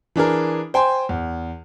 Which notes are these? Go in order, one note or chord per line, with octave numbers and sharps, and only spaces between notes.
E3 D4 G#4 A#4
C5 G5 G#5 C6
E2